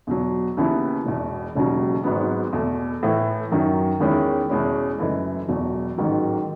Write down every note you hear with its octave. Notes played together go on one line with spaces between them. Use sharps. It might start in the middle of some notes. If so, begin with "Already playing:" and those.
E2 B2 F#3
D#2 C#3 E3 B3 E4
E1 E2 B2
E1 D#2 C#3 F#3
G#1 G#2 F#3 B3
E2 B2 A3
A2 E3 A3
F#2 D#3 F#3
E2 D#3 G#3 C#4 E4
E2 B2 G#3 C#4 E4
F#1 F#2 E3 A3
E1 E2 B2 F#3
A1 G#2 D#3 F#3